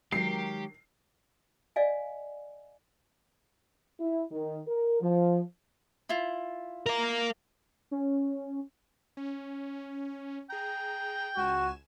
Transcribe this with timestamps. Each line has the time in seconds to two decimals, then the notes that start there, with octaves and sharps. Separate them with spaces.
0.13 D#3 F#3 G#3 G4 A#4 C7
1.76 D5 D#5 F5 G#5
3.99 E4
4.31 D#3
4.67 A#4
5.01 F3
6.09 E4 F4
6.86 A#4 F5
7.91 C#4
9.17 C#4
10.50 G#4 G5 A#5
11.37 C#2 F#4 G#5 E7